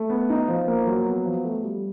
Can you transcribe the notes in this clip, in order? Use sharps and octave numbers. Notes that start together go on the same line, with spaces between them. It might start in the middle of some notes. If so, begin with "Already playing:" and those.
Already playing: A3
B3
D#4
F3
A#3
F#3
B3
F3
A3
G3